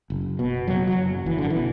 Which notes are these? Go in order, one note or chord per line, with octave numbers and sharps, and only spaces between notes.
F#1
B2
F#1 F#3
F#3
F#1
F#1 E3
D3
E3
B2